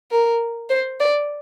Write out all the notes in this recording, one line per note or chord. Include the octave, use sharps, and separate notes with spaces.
A#4
C5
D5